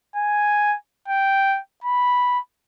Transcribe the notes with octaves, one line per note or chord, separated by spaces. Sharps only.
G#5
G5
B5